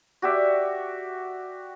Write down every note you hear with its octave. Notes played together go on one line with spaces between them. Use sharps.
F#4 G4 D5 E5